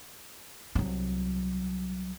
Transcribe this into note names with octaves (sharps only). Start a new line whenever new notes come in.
C2 F#3